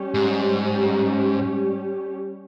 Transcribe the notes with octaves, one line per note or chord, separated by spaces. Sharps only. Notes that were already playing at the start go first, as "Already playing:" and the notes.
Already playing: G3 C#4 G4
G#2